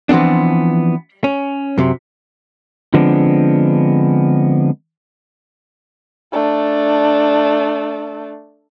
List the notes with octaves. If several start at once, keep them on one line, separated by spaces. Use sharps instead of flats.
E3 F3 B3 C4 D4
C#4
F#2 C3
D3 F3 G#3 B3 C4 D4
A3 D4